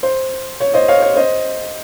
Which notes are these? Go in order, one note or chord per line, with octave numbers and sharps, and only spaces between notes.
C5
C#5
C5 D#5
C#5 F5
C#5
C5 D#5